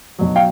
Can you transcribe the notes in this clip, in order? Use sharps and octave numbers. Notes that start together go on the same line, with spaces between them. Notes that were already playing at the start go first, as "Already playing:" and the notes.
B1 B2 F#3
F5 G5